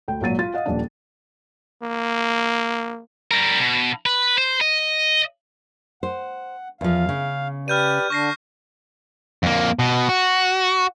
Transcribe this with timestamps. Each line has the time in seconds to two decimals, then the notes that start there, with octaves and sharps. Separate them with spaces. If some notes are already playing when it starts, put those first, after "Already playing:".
0.08 D2 G5
0.21 G#1 A#2 F#3 A6 D#7
0.39 F4 A6
0.54 D#5 F5 F#5
0.66 D#1 F2 D4
1.82 A#3
3.31 G3 A#4
3.60 B2
4.06 B4
4.38 C5
4.61 D#5
6.03 C5 F#5
6.81 E2 F3 F5
7.09 C#3
7.68 G4 B4 D5 F6 G6 D#7
8.10 D3 D4 C#6 A#6 C7
9.43 F2 A#3
9.79 B2
10.09 F#4